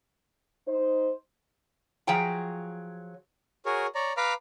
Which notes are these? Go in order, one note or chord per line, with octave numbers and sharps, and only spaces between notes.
D#4 C5
F3 F#3 G#4 C#5 G5 A#5
F#4 G#4 A#4 C#5
C#5 D5 A#5
B4 F5 A#5 B5 D6 F6